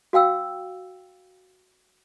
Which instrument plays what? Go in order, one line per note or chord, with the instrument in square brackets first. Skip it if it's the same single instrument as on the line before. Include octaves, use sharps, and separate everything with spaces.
[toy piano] F#4 F5 G5 E6